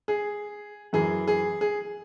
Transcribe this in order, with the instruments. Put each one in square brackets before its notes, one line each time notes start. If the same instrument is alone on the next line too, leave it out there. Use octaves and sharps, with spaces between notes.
[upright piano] G#4
F#2 E3 G#4
G#4
G#4